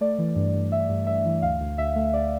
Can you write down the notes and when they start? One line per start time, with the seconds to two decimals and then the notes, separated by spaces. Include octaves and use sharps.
0.01 A3 D5
0.19 E3
0.36 G2
0.54 G2
0.72 G2 E5
0.89 G2
1.07 G2 E5
1.25 E3
1.42 D2 F5
1.60 D2
1.78 D2 E5
1.96 A3
2.13 D2 D5